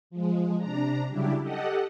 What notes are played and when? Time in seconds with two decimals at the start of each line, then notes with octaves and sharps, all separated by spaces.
0.10 F3 G#3
0.58 C3 D4 A#5
1.08 C#3 F#3 G3 D4 E4 G4
1.42 G4 A4 D#5 F#5